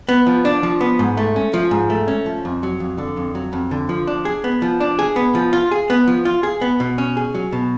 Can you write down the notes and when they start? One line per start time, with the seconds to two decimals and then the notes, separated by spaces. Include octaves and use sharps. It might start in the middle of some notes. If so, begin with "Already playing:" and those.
0.09 B3
0.27 F3
0.45 D4
0.63 F3
0.81 B3
0.99 G#2
1.17 A3
1.36 C#4
1.53 F3
1.71 G#2
1.90 A3
2.08 C#4
2.26 F3
2.45 F2
2.63 F#3
2.80 F2
2.98 D3
3.17 F2
3.35 F#3
3.53 F2
3.71 D3
3.89 F3
4.07 D4
4.25 G#4
4.44 B3
4.62 F3
4.80 D4
4.99 G#4
5.16 B3
5.35 F3
5.53 F4
5.71 G#4
5.90 B3
6.08 F3
6.25 F4
6.43 G#4
6.61 B3
6.80 B2
6.98 C#4
7.17 G#4
7.35 F#3
7.53 B2